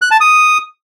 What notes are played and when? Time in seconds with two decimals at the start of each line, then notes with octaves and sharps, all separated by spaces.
0.02 F#6
0.11 A5
0.21 D#6